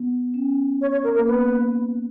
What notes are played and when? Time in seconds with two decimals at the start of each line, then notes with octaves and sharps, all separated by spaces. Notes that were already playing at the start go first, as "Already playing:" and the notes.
Already playing: B3
0.34 C#4
0.81 C#5
0.92 C#5
1.04 A#4
1.15 A#3 A#4
1.28 B3 B4
1.50 A#3